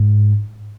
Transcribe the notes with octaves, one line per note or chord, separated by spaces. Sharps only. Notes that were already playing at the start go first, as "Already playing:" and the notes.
Already playing: G#2